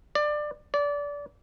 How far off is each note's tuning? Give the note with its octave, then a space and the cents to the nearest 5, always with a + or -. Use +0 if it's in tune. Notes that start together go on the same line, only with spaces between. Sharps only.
D5 +20
D5 -25